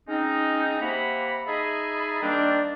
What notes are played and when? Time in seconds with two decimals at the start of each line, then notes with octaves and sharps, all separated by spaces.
0.08 G#3 C4 C#4 D#4
0.80 C3 A#3 F#5 B5
1.46 D#4 G#4 D#5 E5 A5 B5
2.21 D#3 G3 A#3 C4 D4